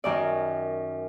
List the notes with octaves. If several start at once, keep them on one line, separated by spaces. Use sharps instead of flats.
F#2 D#3 D5